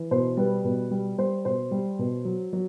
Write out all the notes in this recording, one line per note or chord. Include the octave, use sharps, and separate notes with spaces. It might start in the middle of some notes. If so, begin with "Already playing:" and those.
Already playing: E3
B2 C5
G3 B4
B2
G3
G3 C5
B2 C5
G3
B2
F#3
F#3